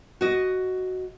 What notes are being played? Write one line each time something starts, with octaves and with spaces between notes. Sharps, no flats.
F#4 D#5